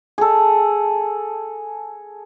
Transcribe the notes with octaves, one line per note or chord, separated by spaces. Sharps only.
G#4 A4